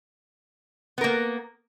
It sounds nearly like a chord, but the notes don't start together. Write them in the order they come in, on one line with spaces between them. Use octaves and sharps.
B3 A#4 A#3